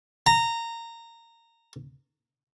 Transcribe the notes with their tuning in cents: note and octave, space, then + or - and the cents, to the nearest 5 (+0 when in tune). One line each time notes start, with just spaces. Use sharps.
A#5 -15